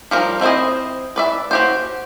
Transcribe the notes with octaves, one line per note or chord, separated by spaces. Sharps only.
F3 G3 A#4
C4 E4 F#4 C5 D#5
B4 D5 E5
F#4 G4 C5